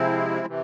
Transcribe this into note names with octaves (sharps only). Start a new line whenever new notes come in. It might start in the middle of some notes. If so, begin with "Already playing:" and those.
Already playing: C3 F3 G#3 C4 E4
C3 E3